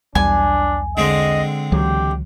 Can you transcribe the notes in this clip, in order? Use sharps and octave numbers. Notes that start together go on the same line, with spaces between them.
B1 E2 G3 D4 G#5
D3 G#3 C4 D#5
C#2 E3 F#3 G4